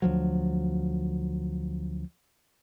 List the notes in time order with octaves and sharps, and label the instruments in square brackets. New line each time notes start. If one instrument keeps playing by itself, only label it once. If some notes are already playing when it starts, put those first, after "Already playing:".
[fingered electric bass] D2 F3 F#3